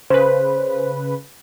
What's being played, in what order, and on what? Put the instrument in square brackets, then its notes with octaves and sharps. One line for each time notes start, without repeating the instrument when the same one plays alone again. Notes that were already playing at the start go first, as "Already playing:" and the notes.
[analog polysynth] C#3 B4 [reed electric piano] C5